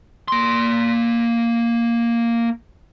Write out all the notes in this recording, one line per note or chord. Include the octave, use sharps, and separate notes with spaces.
A#3 C6